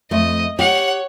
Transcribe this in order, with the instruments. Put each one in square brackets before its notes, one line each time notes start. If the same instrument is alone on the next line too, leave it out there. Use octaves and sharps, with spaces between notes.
[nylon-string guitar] F2 A3 [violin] D#5
[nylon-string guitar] G4 [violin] C#5 [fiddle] F#5